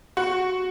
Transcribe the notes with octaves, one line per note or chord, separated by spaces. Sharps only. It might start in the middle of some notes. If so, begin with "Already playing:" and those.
F#4